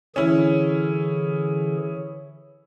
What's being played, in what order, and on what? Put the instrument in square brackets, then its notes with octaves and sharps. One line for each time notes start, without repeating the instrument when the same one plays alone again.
[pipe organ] D3 E3 G#4 [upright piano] C#4 E4